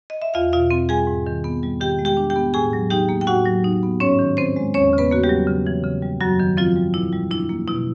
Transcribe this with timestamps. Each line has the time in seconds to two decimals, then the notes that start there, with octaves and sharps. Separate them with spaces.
0.10 D#5
0.22 E5
0.34 E2 F4 F5
0.53 B2 F4 F5
0.71 C4
0.89 G3 G#4 G#5
1.07 G#2
1.26 D#3
1.44 B3
1.63 G3
1.80 D#3 G4 G5
1.99 G#3
2.05 G4 G5
2.17 D4
2.30 G4 G5
2.36 B3
2.54 A2 G#4 G#5
2.73 F#3
2.90 D#4 G4 G5
3.09 A#3
3.21 G5
3.27 A2 F#4 F#5
3.45 F#3
3.64 D#4
3.83 B3
4.00 G#2 C#4 C#5
4.19 D#3
4.37 C4 C5
4.56 G#3
4.74 E2 C#4 C#5
4.93 C#3
4.98 B3 B4
5.12 A#3 F#4
5.24 G3 G4
5.29 F#3
5.47 C#3
5.67 E3
5.84 C#3
6.02 G3
6.20 F#2 F#3 F#4
6.40 D#3
6.57 F3 C4 F4
6.76 G3
6.94 A#2 E4
7.13 G3
7.31 D4 E4
7.49 A#3
7.68 B2 E4